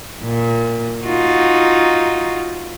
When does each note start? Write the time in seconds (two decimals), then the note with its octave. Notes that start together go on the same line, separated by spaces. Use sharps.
0.23 A#2
1.05 D#4 F4 F#4